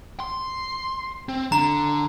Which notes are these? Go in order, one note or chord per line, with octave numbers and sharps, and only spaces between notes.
C6
C4
D3 A#5